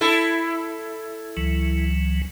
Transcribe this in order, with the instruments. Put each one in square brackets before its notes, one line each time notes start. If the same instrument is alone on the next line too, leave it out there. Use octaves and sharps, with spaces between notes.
[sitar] E4 A4
[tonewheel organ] C#2 E3 F#3